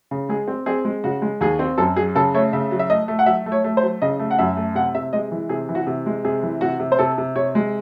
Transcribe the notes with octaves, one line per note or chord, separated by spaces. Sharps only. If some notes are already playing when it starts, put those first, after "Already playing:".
C#3
G#3 G#4
C4
C4 G#4
G#3
C#3 F#4
G#3
D#2 G#4
C4
F#2 A4
F#3 G#4
C#3 A4
A3 C#5
C#3 E5
F#3
E5
A3 D#5
A3
F#5
F#3 E5
A3
C#5
A3
C5
F#3
C#3 D#5
A3
F#5
F#2 E5
A3
C3 F#5
C3 E5
G#3 D#5
E3
C3 G#4
E3
F#4
C3
G#3
C3 G#4
E3
C3 F#4
C3
C5
C3 A4
C3
C3 C#5
G#3